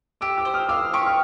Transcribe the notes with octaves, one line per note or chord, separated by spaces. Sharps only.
G4 D6 E6
D6 E6
C5
D#6 F6
F5 D6 E6
G4 C#6 D#6
F6